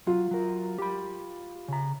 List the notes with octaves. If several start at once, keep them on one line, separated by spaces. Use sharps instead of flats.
F#3 F4
F#3 A#4
G4 B5
C#3 A#5